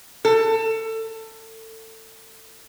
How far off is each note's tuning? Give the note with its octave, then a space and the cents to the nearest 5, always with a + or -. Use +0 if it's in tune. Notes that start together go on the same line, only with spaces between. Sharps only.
A4 +25